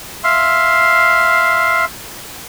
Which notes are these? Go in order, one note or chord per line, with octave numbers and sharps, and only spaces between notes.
E5 F5 C6